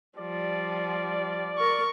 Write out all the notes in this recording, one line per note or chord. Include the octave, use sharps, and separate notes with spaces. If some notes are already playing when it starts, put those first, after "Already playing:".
F3 G3 D5
A#4 C#6